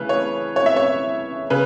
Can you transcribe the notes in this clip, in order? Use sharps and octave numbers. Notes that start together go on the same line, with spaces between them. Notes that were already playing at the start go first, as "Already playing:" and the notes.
Already playing: C#3 E3 A3 B4
C#5
C#5
E5
C#5
C#3 B4